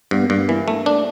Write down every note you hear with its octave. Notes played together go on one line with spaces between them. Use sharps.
G2 B3
A#3
G2
B3
E3 A#3
A3
D4